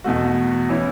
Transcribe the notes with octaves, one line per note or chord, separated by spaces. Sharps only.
E2 B2 A3 F#4
E3 C#4 E4